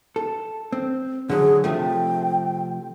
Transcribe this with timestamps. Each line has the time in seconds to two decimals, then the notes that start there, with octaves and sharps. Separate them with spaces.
0.16 A4
0.73 C4
1.30 D3 F#3 G#4
1.64 C3 F3 A3 G5